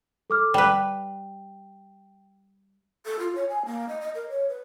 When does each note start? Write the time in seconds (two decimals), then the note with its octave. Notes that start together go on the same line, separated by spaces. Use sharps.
0.30 A4 D6 F6
0.54 G3 B4 G5
3.06 A4
3.19 F4
3.35 C#5
3.49 G#5
3.66 A#3
3.89 D#5
4.01 D#5
4.15 A#4
4.30 C#5
4.49 B4